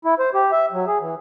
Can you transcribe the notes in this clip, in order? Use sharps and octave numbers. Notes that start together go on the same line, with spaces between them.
E4
C5
G4
E5
F#3
G#4
E3